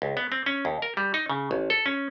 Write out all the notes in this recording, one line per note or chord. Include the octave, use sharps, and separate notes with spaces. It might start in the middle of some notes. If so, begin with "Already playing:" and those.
C#2
B3
C4
C#4
D#2
A#4
G3
D#4
C#3
A1
A4
C#4